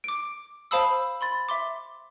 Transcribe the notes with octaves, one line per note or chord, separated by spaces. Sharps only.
D6 D7
C5 F5 A5 B5 D#6 E6
B5 C6 A6
E5 C6 D6